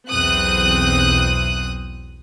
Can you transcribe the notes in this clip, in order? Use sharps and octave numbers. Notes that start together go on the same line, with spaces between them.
B1 E2 C4 D#6 F#6